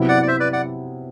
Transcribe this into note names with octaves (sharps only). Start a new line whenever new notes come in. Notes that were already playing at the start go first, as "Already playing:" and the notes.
Already playing: C3 F#3 B3 E4
D5 F#5
D5
C5 E5
B4 D5
D5 F#5